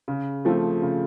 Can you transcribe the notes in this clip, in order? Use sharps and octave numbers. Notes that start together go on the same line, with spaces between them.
C#3
F3 A3 C4
C#3